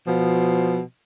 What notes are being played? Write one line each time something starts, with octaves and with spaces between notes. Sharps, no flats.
B2 F3